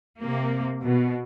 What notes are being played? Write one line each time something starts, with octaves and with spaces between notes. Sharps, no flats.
C3 A#3
B2